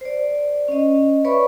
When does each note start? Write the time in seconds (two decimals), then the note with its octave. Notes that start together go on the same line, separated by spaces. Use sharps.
0.01 C5 D5
0.68 C#4 D#5
1.25 B4 C#5 D5 E5 B5 C#6